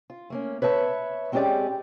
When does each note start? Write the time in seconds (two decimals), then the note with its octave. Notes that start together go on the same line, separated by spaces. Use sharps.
0.10 F4
0.30 A3 A#3 C#4
0.62 B4 C#5 E5 A5
1.32 G#3 C4 C#4 G4 G#4 D5